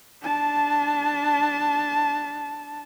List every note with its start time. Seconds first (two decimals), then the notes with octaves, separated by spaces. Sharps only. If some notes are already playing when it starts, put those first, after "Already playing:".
0.23 D4 A5